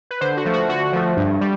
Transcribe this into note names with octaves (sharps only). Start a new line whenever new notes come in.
B4
D3 C5
F#4
F3 A3
F#4
D3 F#4
F3 A3
G2
G3